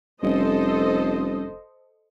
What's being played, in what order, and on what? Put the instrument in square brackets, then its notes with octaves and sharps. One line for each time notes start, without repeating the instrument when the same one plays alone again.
[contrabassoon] F1 [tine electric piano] G3 C#4 [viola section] A4 C5 D#5